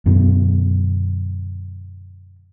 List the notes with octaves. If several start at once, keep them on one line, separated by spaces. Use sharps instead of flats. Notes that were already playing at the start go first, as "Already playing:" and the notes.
F#2 B2 D3